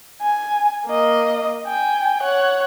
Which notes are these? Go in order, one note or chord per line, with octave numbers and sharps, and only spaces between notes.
G#5
A#3 D#5
G5 G#5
C#5 F#5